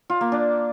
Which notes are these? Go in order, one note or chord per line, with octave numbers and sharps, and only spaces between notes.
F4
A#3
D4